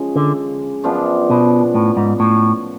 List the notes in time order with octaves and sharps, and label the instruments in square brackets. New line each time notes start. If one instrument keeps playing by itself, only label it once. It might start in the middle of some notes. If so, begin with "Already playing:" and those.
Already playing: [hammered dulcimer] F#2 C#3 F3 G#3
[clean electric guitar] D3
[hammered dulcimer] F#2 F3 B3 D4
[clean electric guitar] B2
A2
G#2
A2